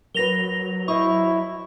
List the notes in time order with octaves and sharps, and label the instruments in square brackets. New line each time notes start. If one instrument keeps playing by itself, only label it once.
[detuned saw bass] F#3 [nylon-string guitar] A#4 B4 [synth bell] A#6 F7 G7
[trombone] E4 [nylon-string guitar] C5 D#5 [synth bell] C#6